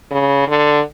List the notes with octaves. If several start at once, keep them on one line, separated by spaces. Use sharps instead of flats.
C#3
D3